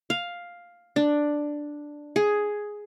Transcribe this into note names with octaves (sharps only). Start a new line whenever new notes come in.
F5
D4
G#4